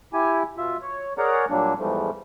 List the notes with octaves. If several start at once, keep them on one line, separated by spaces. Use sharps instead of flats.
E4 G4 G#5
B2 F4 E5
C#5
G#4 A#4 C#5 D5 F#5 A#5
A#2 F#3 G3 A#3 D4
E2 G#2 E3 F3 G3 A3